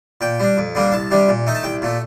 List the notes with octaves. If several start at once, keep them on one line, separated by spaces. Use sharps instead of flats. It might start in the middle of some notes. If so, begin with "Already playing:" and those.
A#2 G5
G3 D4
F2
D3 G3 A#3 D4
C2 A5
C3 G3 D4
A#2
A3 D#4
A5
C2 G5
A#2 A3